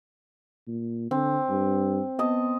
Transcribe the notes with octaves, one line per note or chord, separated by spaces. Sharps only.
A#2
D3 C4
G2
B3 D#5 A5